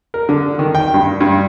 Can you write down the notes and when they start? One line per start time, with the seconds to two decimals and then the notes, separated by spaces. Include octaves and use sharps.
0.14 A#4
0.29 D3
0.59 D#3
0.75 G5
0.94 G2
1.21 G2